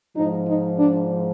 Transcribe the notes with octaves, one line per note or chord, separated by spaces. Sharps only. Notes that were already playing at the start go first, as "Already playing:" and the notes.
G#2 F3 D#4
D#4
D4